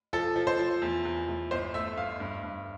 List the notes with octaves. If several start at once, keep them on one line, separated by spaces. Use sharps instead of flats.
F3 A4
F3
C5
F3
E2
E2
E2
G1 C5
A3 E5
G1 F5
G2
G2